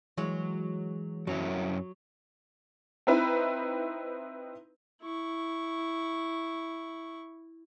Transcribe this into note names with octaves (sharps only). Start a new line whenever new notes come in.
E3 F#3 G#3
F#2 F#3 C#4 E4
C4 D#4 E4 B4
E4 C#6